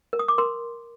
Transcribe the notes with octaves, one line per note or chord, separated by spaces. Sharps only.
A#4
D#6
D6
A#4 C6